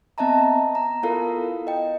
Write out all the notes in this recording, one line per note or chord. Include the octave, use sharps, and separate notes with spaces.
B3 C4 D#5 E5 A5 A#5
A#5
B3 E4 F4 A4 A#4 F5
D#5 G5